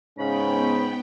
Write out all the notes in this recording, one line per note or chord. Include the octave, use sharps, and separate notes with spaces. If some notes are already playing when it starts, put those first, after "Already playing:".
G#2 C#3 B3 C#4 G5 B5